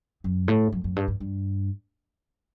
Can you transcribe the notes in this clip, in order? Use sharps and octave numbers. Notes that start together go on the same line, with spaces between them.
F#2
A2
F#2
F#2
G2
G2
G2